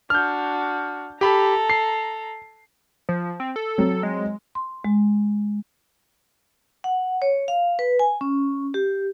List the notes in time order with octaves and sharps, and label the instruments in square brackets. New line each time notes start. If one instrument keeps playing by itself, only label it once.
[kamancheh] D4 F#4 [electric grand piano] F6 G6
[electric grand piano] G4 B5 [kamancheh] A4 A#5
[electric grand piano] C7
[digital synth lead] F3
C4
A4
[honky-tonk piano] F#3 C4
[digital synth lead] G#3
[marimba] C6
G#3
[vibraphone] F#5
C#5
F5
B4
G#5
C#4
G4